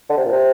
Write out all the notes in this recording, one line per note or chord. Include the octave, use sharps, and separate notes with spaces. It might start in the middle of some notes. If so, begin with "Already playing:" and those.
D3
C3
A#2
C3